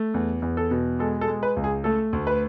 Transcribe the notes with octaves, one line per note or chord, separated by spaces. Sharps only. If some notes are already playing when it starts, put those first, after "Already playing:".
Already playing: A3
E2
E2
A4
B2
G#3 A4
A4
G#3
B4
C#2
G#4
A3 A4
D2
B4